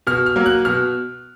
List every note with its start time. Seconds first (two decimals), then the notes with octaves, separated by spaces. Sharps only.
0.07 B2 F6
0.26 F6
0.36 F#3 A#3
0.46 F#6
0.65 B2 F6